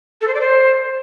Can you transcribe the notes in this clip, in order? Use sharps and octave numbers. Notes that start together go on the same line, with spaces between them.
A4
C5
D5
C5